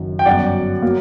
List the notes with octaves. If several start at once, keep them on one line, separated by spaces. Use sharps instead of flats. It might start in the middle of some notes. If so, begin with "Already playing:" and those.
Already playing: F#1 F#2 D#3
G5
G1 F#2 F#3 D5 F#5
F#3 A#3